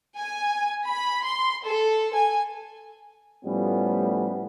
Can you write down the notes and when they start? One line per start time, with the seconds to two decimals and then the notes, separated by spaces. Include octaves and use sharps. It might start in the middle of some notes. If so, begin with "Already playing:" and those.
0.17 G#5
0.87 B5
1.23 C6
1.65 A4
2.14 G#5
3.45 A2 F3 G3 A3 B3 C#4